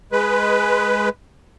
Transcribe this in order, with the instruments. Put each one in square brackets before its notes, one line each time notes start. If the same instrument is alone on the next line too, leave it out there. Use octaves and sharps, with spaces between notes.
[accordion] G#3 B4